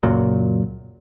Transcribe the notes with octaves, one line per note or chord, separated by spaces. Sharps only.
C#2 F#2 A#2 F#3